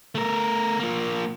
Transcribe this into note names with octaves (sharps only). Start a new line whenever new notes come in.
A3 A#4
F3 A#3